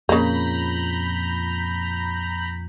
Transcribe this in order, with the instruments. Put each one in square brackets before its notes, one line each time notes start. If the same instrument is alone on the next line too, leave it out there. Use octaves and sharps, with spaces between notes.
[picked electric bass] F2 A#2 [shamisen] C#3 A#3 [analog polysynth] A#5 B5 G6